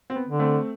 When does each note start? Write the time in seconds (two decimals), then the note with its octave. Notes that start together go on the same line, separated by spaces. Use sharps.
0.10 C4
0.16 B3
0.27 D3
0.39 A3 C4